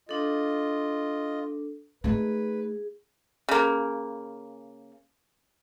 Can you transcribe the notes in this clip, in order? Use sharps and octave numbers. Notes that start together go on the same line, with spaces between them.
D4 F4 A4 D#5
A3 D#4 G#4 B4
C#3 A#3